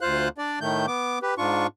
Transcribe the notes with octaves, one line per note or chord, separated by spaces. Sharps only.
D2 F4 C5 F5 F#6
D4 D5
A2 D#3 A3 G6
B3 D6
G4 B4
G#2 D4 F4 C#6